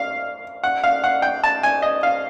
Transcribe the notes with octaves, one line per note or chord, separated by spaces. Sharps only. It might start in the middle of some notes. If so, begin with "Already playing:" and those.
Already playing: F5
F#5
F5
F#5
G5
A5
G#5
D#5
F5